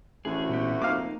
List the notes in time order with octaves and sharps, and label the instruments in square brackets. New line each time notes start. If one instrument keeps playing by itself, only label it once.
[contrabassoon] A1 [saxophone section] D2 A3 F#4 [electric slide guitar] G#4
[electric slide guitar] A#2 B3 G4
[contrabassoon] F1 [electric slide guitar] A#3 D#4 [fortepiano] F5 D6